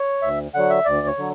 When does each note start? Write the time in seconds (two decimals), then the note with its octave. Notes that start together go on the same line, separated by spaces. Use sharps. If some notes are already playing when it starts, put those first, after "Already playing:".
Already playing: C#5
0.22 D2 E5
0.54 D3 F#3 F#5
0.70 E5
0.85 D2 D5
1.07 C#5
1.18 D3 F#3